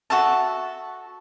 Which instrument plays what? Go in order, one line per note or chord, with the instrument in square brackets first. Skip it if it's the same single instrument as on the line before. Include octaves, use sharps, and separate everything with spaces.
[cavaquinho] F#4 A4 E5 A5